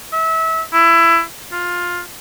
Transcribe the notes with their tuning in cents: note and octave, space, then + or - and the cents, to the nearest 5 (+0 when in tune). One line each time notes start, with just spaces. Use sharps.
E5 -30
E4 +20
F4 +15